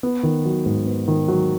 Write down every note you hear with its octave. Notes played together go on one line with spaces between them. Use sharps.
B3
D#3
F#3
G#2
B3
D#3
F#3